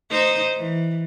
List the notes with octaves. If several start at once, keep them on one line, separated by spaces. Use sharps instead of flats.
D#4 C5
E3